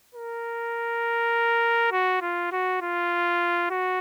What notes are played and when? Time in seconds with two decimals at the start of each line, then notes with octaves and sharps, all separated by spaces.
0.15 A#4
1.92 F#4
2.22 F4
2.52 F#4
2.82 F4
3.70 F#4